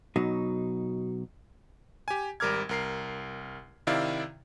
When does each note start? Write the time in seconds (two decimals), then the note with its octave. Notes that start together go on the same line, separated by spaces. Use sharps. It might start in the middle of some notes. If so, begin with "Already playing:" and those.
0.16 B2 F#3 D#4
2.08 G4 G#5
2.40 G#1 G3 A#4 D6 F6 G#6
2.69 C2 A#4 C7
3.87 C3 D#3 E4 D5 F5 E6